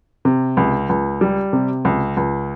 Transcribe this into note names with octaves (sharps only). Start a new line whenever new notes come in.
C3
C#2
C#2
G3
C3
C#2
C#2